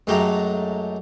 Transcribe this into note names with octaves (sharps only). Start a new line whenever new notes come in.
F#2 F#3 G#3 A3 G4 A#5